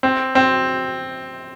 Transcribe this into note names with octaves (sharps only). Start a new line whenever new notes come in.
C4
C4